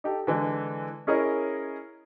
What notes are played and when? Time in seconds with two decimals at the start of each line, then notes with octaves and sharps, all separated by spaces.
0.04 D#4 G4 A4
0.27 D3 E3 G#3
1.07 C#4 E4 G#4 A#4 C#5 D#5